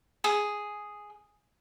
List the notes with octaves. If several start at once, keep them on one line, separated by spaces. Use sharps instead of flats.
G#4